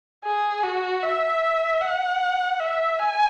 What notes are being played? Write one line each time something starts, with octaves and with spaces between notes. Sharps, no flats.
G#4
F#4
E5
F#5
E5
G#5